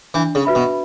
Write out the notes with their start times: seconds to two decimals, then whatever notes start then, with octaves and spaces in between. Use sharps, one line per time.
0.14 E3 D4
0.35 C#3
0.45 F#4 B4 E5 B5
0.55 B2